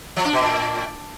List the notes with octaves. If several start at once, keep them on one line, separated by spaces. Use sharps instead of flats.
F3
D4
B2
A2